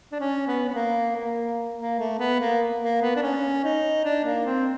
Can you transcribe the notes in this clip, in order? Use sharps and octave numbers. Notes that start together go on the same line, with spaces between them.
D4
C#4
B3
B3
A#3
A#3
A#3
A3
B3
A#3
A#3
B3
D4
C#4
D#4
D4
A#3
C4